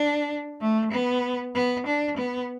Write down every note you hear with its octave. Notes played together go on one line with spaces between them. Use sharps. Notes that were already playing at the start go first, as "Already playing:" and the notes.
Already playing: D4
A3
B3
B3
D4
B3